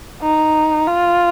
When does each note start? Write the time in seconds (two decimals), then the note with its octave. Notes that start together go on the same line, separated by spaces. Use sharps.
0.22 D#4
0.87 F4